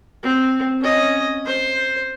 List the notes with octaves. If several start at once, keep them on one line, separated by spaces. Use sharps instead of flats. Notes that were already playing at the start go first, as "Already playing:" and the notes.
C4
C#4 D#5
C5